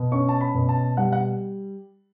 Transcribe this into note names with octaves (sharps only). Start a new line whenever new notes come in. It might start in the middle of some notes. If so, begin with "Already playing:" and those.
Already playing: B2
C#4 C#6
A5
B5
B2
A5
G3 F#5
F#5